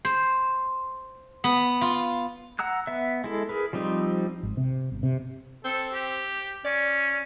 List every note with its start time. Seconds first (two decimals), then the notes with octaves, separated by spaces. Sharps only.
0.05 C5
1.44 B3
1.81 F4
2.59 F#5 A#5 E6 F#6
2.87 B3 E5
3.24 G#3 E4 A4
3.49 G#4 A#4 B4
3.73 F3 G3 C4 D#4
4.43 G#1
4.57 C3
4.92 G1
5.03 C3
5.65 C4 A4
5.93 G4
6.65 C#4 D5